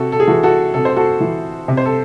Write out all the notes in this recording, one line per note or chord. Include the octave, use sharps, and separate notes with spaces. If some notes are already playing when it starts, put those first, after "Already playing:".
Already playing: C3 F#4 A4
A4
G#4
E3 F#4 A4
F#4 A4
C3 A4
C5
F#4 A4
E3
C3
C5
A4